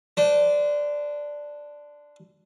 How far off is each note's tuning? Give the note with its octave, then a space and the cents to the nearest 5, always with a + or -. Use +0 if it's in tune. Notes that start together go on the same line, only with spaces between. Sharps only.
D4 +0 C5 -30